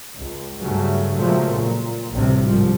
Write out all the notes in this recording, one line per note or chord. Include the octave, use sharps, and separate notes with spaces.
C#2
G2 C#3 F#3 A3
A#2 C#3 F3 F#3 G#3 A3
A#2
A1 D2 A2 C3 G3
C2 G#2 F3 G3